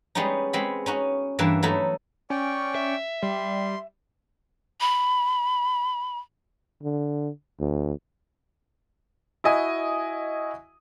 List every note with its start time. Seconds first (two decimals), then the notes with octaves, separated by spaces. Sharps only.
0.15 G3 G#3 B3 C#4 D#4
0.53 G#3 B3 C4 B5
0.86 C#4 D#4 F#4
1.39 G2 E3 A#3 E5
1.63 F#3 A3 D#4 E4
2.30 C#4 D5 G5 C#6
2.75 E5
3.23 G3 C6
4.80 B5
6.83 D3
7.59 D2
9.44 E4 F#4 D#5 G#5